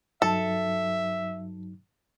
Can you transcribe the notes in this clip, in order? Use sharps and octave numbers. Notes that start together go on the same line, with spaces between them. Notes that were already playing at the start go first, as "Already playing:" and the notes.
G2 F#3 D#4 A4 E5